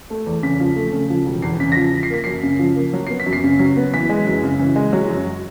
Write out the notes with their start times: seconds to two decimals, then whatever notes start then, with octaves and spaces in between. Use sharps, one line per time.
0.10 A3
0.26 E2
0.43 C#3 B6
0.60 F3
0.76 A3
0.92 C#3
1.10 F3
1.26 E1
1.42 E2 C7
1.60 C#3 B6
1.72 A#6
1.76 F3 B6
1.94 F3
2.03 C7
2.10 A#3 B6
2.24 F#2 C7
2.43 C#3
2.59 F3
2.76 A#3
2.93 F#3
3.07 B3 C7
3.20 B6
3.26 F#2
3.33 C7
3.44 C#3
3.59 F#3
3.76 B3
3.94 E3 B6
4.09 G#3
4.26 F#2
4.43 C#3
4.59 E3
4.76 G#3
4.93 F#3
5.10 F#2